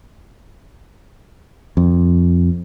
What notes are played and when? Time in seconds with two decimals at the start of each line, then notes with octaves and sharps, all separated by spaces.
1.77 F2